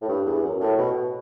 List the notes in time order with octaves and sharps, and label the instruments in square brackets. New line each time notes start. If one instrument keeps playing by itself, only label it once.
[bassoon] A2
G2
E2
F#2
A2
B2